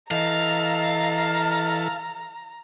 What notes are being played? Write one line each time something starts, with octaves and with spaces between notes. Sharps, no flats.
E3 A4 D#5 F5 A#5